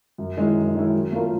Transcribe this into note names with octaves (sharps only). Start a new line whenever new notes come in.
F#2
D#3 G#3 C#4 E4
F#2
D#3 G#3 C#4 E4
F#3
A3 C#4 F4 A#4